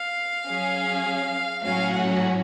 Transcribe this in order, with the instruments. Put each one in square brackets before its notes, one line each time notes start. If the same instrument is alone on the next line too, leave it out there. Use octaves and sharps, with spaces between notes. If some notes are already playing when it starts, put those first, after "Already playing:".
Already playing: [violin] F5
[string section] F#3 C#4 G#4
[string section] A2 F#3 C#4 F#4 [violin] F5
[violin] F#5